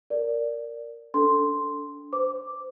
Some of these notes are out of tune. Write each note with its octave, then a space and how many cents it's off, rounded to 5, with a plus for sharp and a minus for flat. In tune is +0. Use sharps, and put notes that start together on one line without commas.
A#4 -5 D5 -5
D4 -25 A4 +10 C6 +0
C5 -20 D6 +0